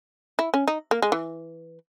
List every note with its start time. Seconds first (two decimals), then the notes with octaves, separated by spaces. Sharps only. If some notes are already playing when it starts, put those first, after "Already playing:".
0.39 E4
0.54 C#4
0.68 D#4
0.91 A#3
1.02 G#3
1.12 E3